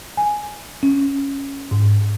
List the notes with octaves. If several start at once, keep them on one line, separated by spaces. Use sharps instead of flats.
G#5
C#4
G#2